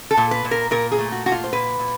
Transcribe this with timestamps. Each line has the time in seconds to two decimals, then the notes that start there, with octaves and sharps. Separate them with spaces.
0.11 A4
0.17 A#2
0.31 B4
0.45 A#2
0.51 A#4
0.71 A#2 A#4
0.92 G#4
0.99 A3
1.12 F#4
1.26 A#2 F#4
1.32 F4
1.44 C5
1.53 A#2 B4
1.79 A#2